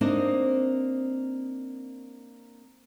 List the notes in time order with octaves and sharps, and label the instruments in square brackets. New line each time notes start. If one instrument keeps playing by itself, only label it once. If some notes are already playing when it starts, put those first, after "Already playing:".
[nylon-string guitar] A#3 C4 D4 D#4